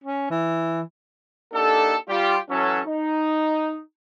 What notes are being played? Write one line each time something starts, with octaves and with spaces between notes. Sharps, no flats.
C#4
E3
A#3 D4 D#4 G4 A4
G3 F4 G4
E3 F#3 C#4 A4
D#4